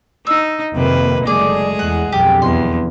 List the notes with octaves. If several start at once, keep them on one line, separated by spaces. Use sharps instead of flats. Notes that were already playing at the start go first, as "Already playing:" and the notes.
D#4 E6
F2 C3 D#3 A#3 B4
F#1 G#3 A3 G#4 D5
E2 F#5
B1 F2 D3 G4
E2 C6